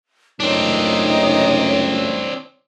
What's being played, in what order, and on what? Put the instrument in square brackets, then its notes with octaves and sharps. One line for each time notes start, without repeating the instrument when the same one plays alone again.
[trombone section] C#2 F#2 A3 [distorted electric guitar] C4 D4 [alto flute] D#4 [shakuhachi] C#5